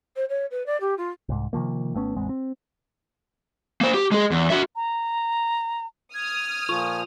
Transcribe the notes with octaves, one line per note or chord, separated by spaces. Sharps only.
C5
C#5
B4
D5
G4
F4
C2 G#2
C3 D#3 F3 A#3
G#1 A3 B3 C#4
A1 E2 G#3 C4
C4
A#3 C5
G4
G#3 G#4
E2
F#4 E5
A#5
D#6 F6 G#6
A#2 F3 F4 C#6 F7